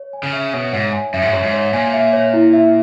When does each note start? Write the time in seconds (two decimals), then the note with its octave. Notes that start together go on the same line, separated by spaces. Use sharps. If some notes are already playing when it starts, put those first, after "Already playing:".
Already playing: C#5
0.13 G#5
0.23 C#3
0.33 E5
0.53 B2 C#5
0.73 G#2 C#5
0.93 G#5
1.14 F#2 E5
1.22 G#2
1.32 F#2 C#5
1.43 G#2
1.53 C#5
1.73 A#2 G#5
1.93 E5
2.13 C#5
2.33 E4
2.53 E5